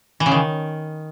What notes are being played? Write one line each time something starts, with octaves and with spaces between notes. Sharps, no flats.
E3
C#3
D#3